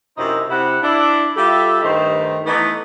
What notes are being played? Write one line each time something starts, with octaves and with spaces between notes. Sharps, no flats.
F#2 C3 D#4 E4 C5 E5
C3 E4 F#5
D4 E4
G3 F4 G4 A4 E5
G2 D#3 A3 D#4 C5
E3 A3 B3 D#4